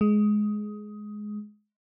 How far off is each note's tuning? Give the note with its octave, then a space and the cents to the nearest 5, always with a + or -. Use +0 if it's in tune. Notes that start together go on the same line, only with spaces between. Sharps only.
G#3 +15